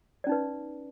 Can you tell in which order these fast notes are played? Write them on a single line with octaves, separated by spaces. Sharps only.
D5 C#4 D#4 B4